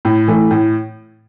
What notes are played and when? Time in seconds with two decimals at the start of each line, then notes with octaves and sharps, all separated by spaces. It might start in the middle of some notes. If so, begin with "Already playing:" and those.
0.05 A2
0.28 E3 A3
0.51 A2